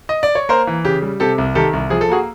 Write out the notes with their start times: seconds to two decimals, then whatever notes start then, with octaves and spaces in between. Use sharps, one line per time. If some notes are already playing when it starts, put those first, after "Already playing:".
0.09 D#5
0.23 D5
0.35 C#5
0.49 A#3 A#4 C5
0.67 E3
0.85 C#3 G4
1.02 G3
1.20 C3 G4 A4
1.38 C2
1.55 D#3 G4 A4
1.73 C2
1.90 F3 G#4
2.01 A4
2.09 A#3 F#4 G#4